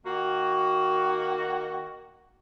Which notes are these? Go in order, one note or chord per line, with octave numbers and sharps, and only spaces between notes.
D#3 A#3 F#4